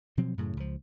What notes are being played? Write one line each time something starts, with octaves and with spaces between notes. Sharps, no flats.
B2 F3 F#3 C4
F#2 A2 C#3
C#2 F3